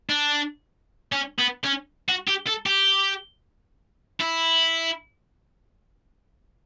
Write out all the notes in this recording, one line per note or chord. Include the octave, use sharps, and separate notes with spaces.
D4
C#4
B3
C#4
F#4
G4
A4
G4
E4